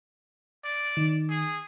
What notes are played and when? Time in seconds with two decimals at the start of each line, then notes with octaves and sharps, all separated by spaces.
0.64 D5
0.97 D#3
1.30 G#4